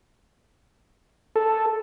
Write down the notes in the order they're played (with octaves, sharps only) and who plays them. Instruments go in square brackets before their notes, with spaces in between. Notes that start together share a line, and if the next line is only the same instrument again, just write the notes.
[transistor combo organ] A4